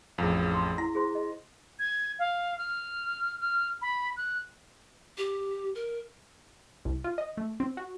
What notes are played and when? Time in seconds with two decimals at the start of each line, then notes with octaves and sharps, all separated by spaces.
0.18 A1 F2 G#4 F5
0.54 C6
0.78 E4 F#5 A#5 A#6
0.95 G#4 C5 C6
1.15 D#5
1.79 G#6
2.19 F5
2.58 F6
3.40 F6
3.82 B5
4.17 F#6
5.18 G4
5.75 A#4
6.85 C2
7.04 F4
7.18 D#5
7.37 A3
7.60 C4
7.77 F#4